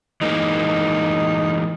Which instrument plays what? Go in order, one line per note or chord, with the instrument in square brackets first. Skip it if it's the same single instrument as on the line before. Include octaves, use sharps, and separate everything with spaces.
[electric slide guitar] E3 G#3 A#3 [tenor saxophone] D#4